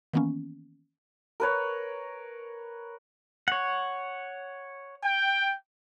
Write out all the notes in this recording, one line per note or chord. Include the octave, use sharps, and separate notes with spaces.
D#3 E3 A#3 B3 C#4
A#4 B4 C#5
C#5 F#5
G5